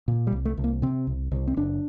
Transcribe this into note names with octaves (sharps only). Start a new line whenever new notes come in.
A#2
G3
C2
A3
C2
A#3
C3 C4
C2
C2
C4
F#1 D4